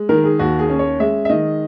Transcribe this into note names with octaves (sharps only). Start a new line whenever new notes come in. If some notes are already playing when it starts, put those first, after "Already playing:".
Already playing: G#3
D#3 A#4
G#4
D#2 F#4
G#4
C#4
C#5
G#3 E5
E5
D#3 D#5